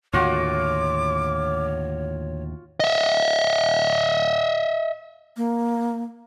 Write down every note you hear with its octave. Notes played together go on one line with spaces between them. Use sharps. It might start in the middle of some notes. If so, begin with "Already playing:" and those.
D#2 A2 D3 F4 F#4 C#5 D6
D#5 E5
A#3